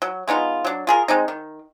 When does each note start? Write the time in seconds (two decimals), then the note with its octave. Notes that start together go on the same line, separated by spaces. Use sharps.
0.02 F#3
0.28 G#3 B3 D#4 F4
0.64 F#3 D4
0.87 F4 G#4 A#4
1.08 G#3 C4 D#4
1.28 D#3